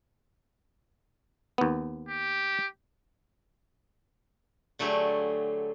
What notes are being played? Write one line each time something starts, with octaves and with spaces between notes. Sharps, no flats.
D#2 B3
G4
D3 F#3 A3 G4 G#4